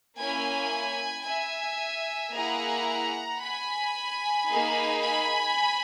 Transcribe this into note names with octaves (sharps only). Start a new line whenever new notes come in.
A#3 C#4 E4 G#5 B5
E5 G#5
A#3 E4 G#4 F#5 A#5
G#5 B5
A#3 D#4 G#4
G#5 B5